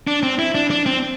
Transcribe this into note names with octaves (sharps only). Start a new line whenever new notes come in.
D4
C4
E4
D4
D4
C4